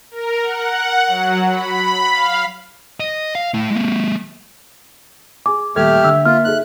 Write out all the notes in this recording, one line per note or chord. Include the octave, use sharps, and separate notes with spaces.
A#4
F#5
F#3
B5
F5
D#5
F5
A3 E4
G#3 A#3
G#4 G#5 D6
D#1 A3 G4 A4 E5 F6 G#6
D3 E6
A#3 F4 F6
D#4 G#4 A4 F#6